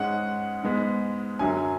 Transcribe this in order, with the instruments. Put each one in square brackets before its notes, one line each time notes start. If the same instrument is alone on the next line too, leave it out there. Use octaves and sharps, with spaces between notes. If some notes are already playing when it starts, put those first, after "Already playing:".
Already playing: [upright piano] G#2 G#3 C#4 F#5
G#2 G#3 B3
F#2 D3 F#3 C#4 G#5